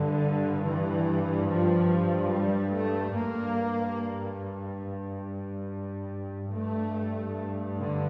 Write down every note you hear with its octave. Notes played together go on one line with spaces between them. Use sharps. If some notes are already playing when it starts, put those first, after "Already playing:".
Already playing: G2 D3
E3
F3
G3
A3
G2 A#3
G2 A3
D3